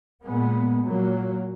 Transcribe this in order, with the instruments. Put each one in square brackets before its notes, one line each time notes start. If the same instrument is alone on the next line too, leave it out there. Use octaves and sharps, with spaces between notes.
[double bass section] A#2 G#3 B3
A#2 F#3 A#3